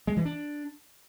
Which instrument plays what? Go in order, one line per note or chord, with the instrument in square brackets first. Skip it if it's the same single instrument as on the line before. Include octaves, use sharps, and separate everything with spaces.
[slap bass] G#3
E3
D4